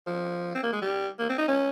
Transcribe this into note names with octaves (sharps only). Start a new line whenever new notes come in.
F3
C4
A#3
G#3
G3
A#3
C4
D#4
C#4